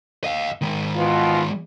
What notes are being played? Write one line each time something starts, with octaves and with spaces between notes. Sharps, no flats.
D#5 F5
D#3 G#3
B2 E3 F4